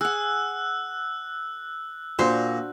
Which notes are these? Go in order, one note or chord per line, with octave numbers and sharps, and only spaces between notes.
G#4 F#5 E6 F#6
A#2 D4 F#4 C5